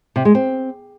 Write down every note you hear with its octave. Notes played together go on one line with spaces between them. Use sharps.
C3
G#3
C4